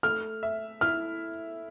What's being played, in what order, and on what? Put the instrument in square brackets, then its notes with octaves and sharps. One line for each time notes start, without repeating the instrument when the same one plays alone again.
[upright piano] A3 [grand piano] F6
[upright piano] E5
[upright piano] E4 [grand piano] F6